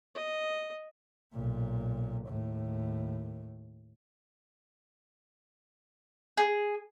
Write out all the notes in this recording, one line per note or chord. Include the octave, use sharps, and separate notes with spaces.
D#5
B1 A#2
D#2 A2
G#4